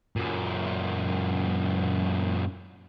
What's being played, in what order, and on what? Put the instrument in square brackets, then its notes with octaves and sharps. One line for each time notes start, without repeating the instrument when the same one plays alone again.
[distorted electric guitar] F#2 A#2